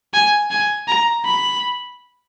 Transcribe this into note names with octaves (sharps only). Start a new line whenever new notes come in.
G#5
G#5
A#5
B5